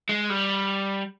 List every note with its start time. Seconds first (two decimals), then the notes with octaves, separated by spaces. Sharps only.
0.09 G#3
0.30 G3